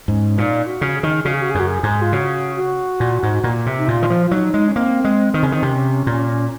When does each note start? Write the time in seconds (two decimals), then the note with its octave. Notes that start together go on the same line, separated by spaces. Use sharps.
0.08 G#2 C#4
0.37 A#2 D#4
0.66 F#4
0.81 C#3
0.96 G#4
1.03 D#3
1.25 C#3 F#4
1.33 G#4
1.42 F#4
1.51 G#4
1.55 F#2
1.60 F#4
1.69 G#4
1.83 G#2
2.02 F4
2.12 C#3 F#4
2.56 F#4
3.00 A#2
3.23 G#2
3.44 A#2
3.66 C3
3.78 D#4
3.87 A#2 F4
4.02 D#3
4.10 F3
4.26 F4
4.31 F#3 D#4
4.54 G#3
4.68 C#4
4.76 A#3 C4
5.04 G#3
5.34 D#3
5.43 C#3
5.52 D#3
5.62 C3 C#4
6.07 A#2